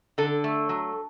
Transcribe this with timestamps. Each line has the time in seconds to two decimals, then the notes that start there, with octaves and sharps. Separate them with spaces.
0.18 D3 A4
0.44 A3
0.69 F#3